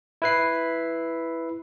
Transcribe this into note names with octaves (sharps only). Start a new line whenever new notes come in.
E4 B4 C7